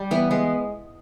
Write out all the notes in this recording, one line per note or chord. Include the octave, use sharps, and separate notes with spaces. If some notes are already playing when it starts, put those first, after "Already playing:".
Already playing: G3
E3 B3
G#3 B3